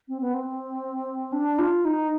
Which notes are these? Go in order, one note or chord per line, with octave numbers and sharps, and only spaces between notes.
C4
B3
C4
D4
F4
D#4